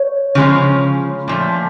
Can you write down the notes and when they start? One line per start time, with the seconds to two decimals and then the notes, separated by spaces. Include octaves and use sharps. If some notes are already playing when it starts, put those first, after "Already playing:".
Already playing: C#5
0.35 C#3 F3 G#3 C#4
1.28 A#2 F3 A3